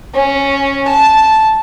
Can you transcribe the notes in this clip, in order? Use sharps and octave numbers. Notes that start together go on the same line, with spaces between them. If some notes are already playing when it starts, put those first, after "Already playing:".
C#4
A5